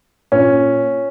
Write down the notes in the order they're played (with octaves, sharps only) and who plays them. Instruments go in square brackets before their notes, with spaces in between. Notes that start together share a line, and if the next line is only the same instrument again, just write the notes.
[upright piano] A#2 C#4